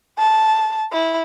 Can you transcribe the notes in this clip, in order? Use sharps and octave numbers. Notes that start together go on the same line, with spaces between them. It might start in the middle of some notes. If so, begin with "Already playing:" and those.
A5
E4